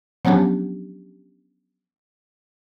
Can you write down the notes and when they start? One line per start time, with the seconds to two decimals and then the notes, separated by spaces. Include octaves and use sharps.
0.25 F3 F#3 B3 C#4 D4 G4